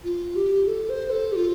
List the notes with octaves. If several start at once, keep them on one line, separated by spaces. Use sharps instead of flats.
F4
G4
A4
C5
A4
G4
F4